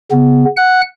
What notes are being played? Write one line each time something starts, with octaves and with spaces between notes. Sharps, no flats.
C#3 B3
F#5 F#6